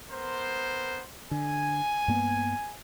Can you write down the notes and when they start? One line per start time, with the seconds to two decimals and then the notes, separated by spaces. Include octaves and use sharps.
0.11 B3 A#4 C5
1.31 D3 G#5
2.08 G2 A#3 B3